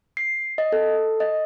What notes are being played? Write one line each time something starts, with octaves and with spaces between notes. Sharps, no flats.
C7
D#5
A4
D#5